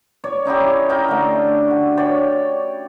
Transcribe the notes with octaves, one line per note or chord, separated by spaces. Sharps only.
C#5 D5
C#4 D#4 E4 G4
D#4 A#4 D5 G5
D3 A3
F#4
C#5 D5 G5